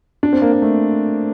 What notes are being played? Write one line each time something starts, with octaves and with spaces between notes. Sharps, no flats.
D4
C4
A#3
A#3
A3